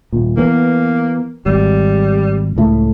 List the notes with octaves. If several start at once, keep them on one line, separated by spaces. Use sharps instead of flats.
D#1 A#2
E3 A#3 B3
G#1 G3
C#2 A2 A3